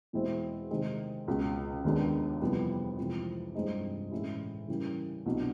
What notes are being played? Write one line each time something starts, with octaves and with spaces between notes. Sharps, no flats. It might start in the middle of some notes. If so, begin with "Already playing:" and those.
E2 B2 G#3 C4 E4
C3 D#3 G#3 C4 D#4
C#2 B2 G#3
D#2 D#3 G#3 B3 D4
F2 C3 E3 G3 B3
F2 C3 E3 G#3
G2 E3 G#3 C4 D#4
A2 E3 G#3 C#4 E4
C#3 E3 G3 A#3
C2 B2 F#3 B3 D4